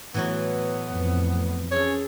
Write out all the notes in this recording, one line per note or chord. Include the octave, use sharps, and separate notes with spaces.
A2 E3 F#3 B3 F#4
F2
C#4 G#4 A4 C#5